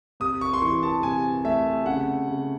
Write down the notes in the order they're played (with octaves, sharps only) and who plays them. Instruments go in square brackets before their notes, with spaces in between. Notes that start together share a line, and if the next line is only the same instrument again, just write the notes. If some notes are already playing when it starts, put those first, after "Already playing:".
[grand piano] C3 D#6
C#6
C6
E3 C#6
A5
C3 G#5
A3 E5
C#3 F#5
C#3